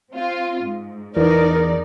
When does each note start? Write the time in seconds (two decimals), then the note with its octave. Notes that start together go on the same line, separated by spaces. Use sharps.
0.11 C4 F4
0.62 G#2
1.17 E2 D#4 A#4 D5